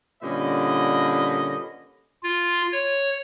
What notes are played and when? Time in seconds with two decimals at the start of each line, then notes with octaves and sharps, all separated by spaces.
0.23 A#2 D3 G3 C#4 B4 D#5
2.23 F4
2.72 C#5